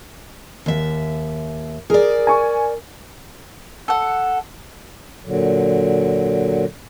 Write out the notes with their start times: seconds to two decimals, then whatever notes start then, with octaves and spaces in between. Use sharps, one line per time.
0.66 D#2 E5
1.90 G#4 A#4 D5
2.27 G#5 C#6
3.88 A4 F#5
5.26 A#2 D3 F#3